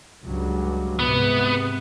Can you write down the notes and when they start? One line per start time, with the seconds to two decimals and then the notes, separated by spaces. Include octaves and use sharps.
0.24 C#2 G2 F#3
1.00 G#2 C3 B3